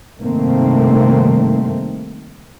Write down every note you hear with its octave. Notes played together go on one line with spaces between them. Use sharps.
G2 C3 D#3 A3 A#3 C4